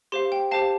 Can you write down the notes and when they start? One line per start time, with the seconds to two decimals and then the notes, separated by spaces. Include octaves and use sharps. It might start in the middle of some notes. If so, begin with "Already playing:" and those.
0.12 G4 C5 F5 C6
0.32 G5
0.51 G4 C5 F5 A5